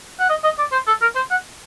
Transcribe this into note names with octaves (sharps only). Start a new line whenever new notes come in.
F#5
D#5
D#5
D5
C5
A4
A#4
C5
F#5